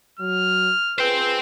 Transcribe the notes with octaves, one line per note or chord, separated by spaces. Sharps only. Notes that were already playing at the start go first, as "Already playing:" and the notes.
F#3 F6
F4 G#4 B4 C5 G5